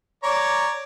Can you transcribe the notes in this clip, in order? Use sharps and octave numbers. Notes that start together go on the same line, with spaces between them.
C#5 D5 A#5